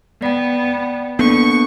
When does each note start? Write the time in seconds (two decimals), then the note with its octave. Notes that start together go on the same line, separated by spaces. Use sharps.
0.22 B3 D5 G5
1.19 A#3 B3 D4 A4 C#6